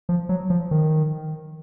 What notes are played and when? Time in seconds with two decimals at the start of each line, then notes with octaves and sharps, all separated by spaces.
0.09 F3
0.29 F#3
0.50 F3
0.71 D#3